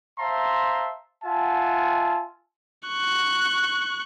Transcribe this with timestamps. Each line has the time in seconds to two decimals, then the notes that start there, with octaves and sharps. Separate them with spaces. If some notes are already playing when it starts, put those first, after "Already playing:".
0.19 C5 E5 F5 A5 A#5 C6
1.24 F4 E5 F#5 G#5 A5
2.88 C#6 F#6